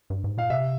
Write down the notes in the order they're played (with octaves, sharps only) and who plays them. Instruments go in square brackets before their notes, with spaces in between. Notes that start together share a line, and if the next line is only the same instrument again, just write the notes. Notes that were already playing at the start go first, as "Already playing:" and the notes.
[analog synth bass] G2
G#2
[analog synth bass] A#2 [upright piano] F5
[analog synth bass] C3 [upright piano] E5